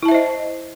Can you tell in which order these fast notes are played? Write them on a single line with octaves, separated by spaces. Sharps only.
E4 A5 E5 C5 D#5